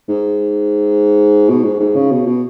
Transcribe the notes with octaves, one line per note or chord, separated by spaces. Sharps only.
G#2
B2
G#2
G#2
C#3
B2
B2